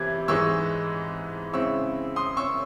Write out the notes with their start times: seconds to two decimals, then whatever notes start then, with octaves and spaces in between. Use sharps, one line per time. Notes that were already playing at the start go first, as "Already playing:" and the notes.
Already playing: C3 E3 E4 G#6
0.28 G#2 E3 G#3 D#4 C#6 E6
1.53 C#3 G#3 C4 E4 C#6 E6
2.16 C6 D#6
2.37 C#6 E6